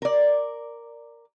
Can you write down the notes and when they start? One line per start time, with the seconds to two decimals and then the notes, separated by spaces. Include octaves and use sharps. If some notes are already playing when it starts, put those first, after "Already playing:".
0.02 A#4 D5